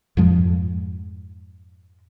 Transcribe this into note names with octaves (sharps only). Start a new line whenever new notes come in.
F2 G#2 F3 G#3